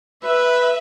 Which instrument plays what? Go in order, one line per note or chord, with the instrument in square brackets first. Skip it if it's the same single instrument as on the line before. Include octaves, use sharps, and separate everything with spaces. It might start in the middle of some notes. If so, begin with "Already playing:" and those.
[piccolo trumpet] B4 [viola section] E5